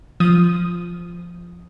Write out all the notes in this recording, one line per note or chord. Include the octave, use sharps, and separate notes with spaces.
F3 D#6